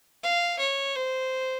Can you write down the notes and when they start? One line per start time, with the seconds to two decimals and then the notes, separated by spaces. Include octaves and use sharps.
0.23 F5
0.59 C#5
0.95 C5